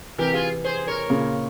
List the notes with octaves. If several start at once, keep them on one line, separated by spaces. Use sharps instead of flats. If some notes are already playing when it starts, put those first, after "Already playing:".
C3 E3 G4 A#4
F4 G#4
G#4 C5
A#4 C#5
A#2 C#3